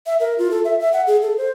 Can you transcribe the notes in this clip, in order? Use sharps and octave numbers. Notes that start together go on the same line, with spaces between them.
E5
A#4
F4
A4
E5
E5
F#5
G#4
A4
C5